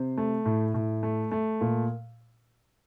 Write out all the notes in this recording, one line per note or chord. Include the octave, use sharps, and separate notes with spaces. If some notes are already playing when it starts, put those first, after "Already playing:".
Already playing: C3 C5
A3
A2
A2
A3
A3
A#2